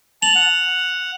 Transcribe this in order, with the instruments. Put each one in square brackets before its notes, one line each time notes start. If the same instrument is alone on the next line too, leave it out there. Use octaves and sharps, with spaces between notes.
[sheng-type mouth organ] A5 [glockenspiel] F7 F#7
[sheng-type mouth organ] F#5